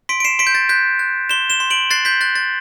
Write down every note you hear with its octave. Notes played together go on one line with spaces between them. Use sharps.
C6 B6 D7
D7
C7 E7
C6 B6 D7
G6
A6
F#6 G6 B6
F#6
C6 E7 G7
E7 G7
C6
D7 F#7
F#6 A6 C7
G6 B6
F#6 A6
A6